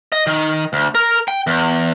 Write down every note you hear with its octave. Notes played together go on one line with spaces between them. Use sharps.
D#5
D#3
D2
A#4
G5
E2